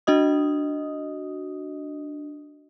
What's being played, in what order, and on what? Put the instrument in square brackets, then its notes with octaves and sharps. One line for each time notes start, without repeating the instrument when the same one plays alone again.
[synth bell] D4 F#4 D#5 D#6